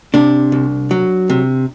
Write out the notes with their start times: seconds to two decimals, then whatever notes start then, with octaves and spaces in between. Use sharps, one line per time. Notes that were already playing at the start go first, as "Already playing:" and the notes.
0.14 C3 D4
0.52 C2
0.91 F#3
1.30 C3